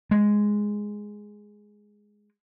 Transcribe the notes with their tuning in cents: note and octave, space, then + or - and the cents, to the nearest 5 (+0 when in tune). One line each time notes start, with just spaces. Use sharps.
G#3 +0